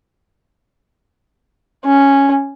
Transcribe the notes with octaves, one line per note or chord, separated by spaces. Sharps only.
C#4